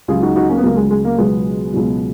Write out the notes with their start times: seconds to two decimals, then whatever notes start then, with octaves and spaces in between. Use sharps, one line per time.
0.08 C#2 C#3 F#3 F4 G#4
0.22 D#4 F#4
0.36 D#4 F#4
0.49 A#3 C#4
0.58 B3
0.63 C#2 C#3 F#3 A#3
0.76 G#3
0.91 G#3
1.05 A#3
1.18 C#2 B2 F#3 G#3 B3
1.73 C#2 B2 F#3